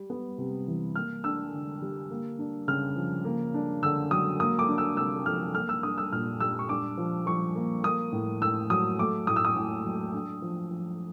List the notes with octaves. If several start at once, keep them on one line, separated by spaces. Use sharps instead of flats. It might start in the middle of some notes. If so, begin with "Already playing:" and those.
Already playing: G3
B3
C3
E3
A#3 F6
D4 E6
D3
G3
A#3
D4
C#3 F6
F3
A#3
D4
D3 E6
F#3 D#6
A#3 D#6
D6
D4
E6
C3 E6
F3 F6
A#3 F6
E6
D4 D#6
E6
A#2 F6
G3 E6
C#6
D4 D6
F3
F3 C#6
A#3
A#3 D#6
A2
A2 E6
F#3 D#6
A3 D6
A2 D#6
E6
D#6
A2
F#3
D4
F3
F3